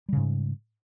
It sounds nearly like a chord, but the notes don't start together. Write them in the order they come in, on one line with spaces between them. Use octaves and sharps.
G3 C#3 G#2